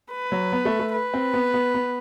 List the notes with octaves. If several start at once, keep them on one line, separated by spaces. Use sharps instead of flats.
B4
F#3
B3
A3
A3
B4
C4
B3
B3
B3